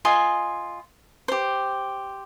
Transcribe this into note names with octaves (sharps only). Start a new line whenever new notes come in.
F4 D#5 G#5 C6
G4 C5